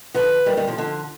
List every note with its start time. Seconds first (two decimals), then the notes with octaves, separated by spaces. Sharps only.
0.14 D3 F3 B4
0.46 D#3 G3
0.57 D#3 G3
0.68 D3 F3
0.78 D3 F3